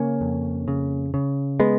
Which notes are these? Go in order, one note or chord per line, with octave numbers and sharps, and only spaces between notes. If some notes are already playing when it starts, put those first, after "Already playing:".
Already playing: C#3 A#3 C#4
F2
C#3
C#3
G#3 B3